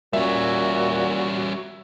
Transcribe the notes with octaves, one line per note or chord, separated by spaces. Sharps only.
A#2 G3 C#4 F#4 E5